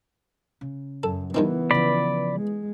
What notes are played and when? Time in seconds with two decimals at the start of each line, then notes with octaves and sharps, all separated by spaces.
0.61 C#3
1.03 F#2 A4
1.34 G2 D#3 E3 B3 C4
1.71 C#3 F3 D5 B5
2.35 G#3